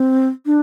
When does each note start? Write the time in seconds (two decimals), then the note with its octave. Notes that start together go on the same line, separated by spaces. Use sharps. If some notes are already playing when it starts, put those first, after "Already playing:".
Already playing: C4
0.46 D4